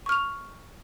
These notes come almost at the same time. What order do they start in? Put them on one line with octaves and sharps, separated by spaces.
C#6 F6 F7